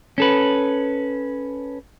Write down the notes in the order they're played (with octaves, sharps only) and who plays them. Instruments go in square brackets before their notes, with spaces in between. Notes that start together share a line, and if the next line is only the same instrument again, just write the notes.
[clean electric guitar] C#4 A4 B4